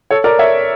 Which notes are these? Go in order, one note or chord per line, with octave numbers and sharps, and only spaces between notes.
A4 C#5
A#4 D5
C#5 E5